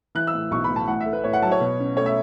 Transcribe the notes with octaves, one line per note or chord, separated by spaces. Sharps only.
E3 F#6
E6
A2
B1 C#6
B5
A2
A5
A1 F#5
E5
A3
B4
A2 C#5
F#5
F#3 A5
C#5
B2
C#4
A3 C#5
E5